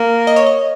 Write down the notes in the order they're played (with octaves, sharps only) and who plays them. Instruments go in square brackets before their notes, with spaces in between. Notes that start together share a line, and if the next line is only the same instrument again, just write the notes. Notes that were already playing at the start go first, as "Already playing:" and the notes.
Already playing: [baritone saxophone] A#3
[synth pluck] D#5
C#5
D#5